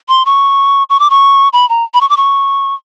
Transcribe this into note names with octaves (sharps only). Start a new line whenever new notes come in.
C6
C#6
C#6
D6
C#6
B5
A#5
B5
C#6
D6
C#6